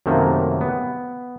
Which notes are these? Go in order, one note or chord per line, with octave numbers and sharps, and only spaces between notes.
F#2 C3 D#3 A3 A#3
B3